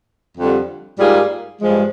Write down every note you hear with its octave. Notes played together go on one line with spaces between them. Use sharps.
F2 D3 G3
G#2 G3 A#3 F4 G#4
G2 F3 G#3